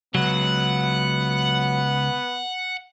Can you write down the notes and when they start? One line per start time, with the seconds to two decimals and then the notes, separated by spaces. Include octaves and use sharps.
0.15 C#2 F#3 B3 F#5